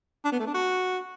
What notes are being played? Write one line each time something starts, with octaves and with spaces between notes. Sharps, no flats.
D4
B3
A3
D4
F#4